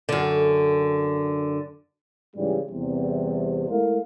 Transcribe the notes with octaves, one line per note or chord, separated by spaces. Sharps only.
F#2 D3
G#2 C#3 E3 G3
E2 C3 G3
G#3 A3 E4 A#4 F5